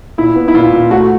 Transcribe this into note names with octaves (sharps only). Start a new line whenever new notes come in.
A#2 E4
B3
E4
A#2 F4
A#2
A3 F#4